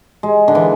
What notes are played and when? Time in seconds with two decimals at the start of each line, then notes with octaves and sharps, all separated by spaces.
0.23 G#3
0.48 D3
0.55 E3